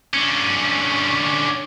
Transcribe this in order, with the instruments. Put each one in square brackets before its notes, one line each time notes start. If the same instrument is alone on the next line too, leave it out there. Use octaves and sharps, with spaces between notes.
[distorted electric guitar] D3 C#4